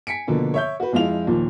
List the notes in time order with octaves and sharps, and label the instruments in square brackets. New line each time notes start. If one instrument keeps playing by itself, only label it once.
[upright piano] G#5 B6 C#7 D7
B2 D3 F3 A#3
C#5 E5 G6
F#4 B4
F2 F3 G#3 E4 F5 F7
D#2 A#2 F3